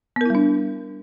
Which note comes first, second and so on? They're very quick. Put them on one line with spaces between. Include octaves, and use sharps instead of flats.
B3 A#4 E4 G3 D4